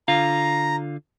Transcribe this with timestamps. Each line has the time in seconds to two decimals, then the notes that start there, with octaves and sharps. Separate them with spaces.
0.08 D3 F4 F5 A#5